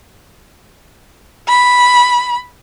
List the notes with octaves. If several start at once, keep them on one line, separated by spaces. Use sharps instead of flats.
B5